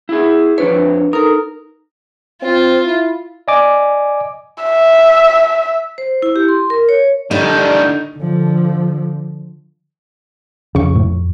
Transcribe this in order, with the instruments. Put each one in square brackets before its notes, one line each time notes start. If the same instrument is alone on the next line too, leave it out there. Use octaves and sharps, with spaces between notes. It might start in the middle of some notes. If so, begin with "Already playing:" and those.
[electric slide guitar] E4 G#4
[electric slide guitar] F2 D4 C#5 [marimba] B4
[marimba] D#4 A4 [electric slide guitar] A#4
[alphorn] C4 [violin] F4
[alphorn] E4
[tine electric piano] D5 D#5 G#5 D6
[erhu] E5
[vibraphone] C5
E4
G4
C6
A#4
C#5
[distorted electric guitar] A2 D#3 [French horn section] D3 D4 [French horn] G3 [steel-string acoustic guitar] D#4
[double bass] D3 F3
[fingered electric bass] F2 [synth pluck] C#3 C#6
[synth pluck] A2